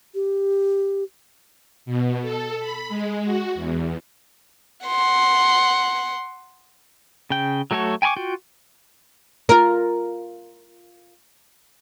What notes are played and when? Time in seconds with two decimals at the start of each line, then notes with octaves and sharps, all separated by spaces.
0.15 G4
1.86 B2
2.22 A4
2.59 B5
2.89 G#3
3.24 F#4
3.55 E2
4.86 F#5 C6
7.30 C#3 G5
7.71 F#3 A3 F#4 A4 C#5
8.02 G5 G#5 A#5 C#6 D6
8.16 F4 F#4 G5
9.49 F4 A#4